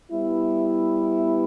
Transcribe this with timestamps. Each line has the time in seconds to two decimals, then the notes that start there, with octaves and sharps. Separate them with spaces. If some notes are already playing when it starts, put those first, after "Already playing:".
0.11 G3 B3 E4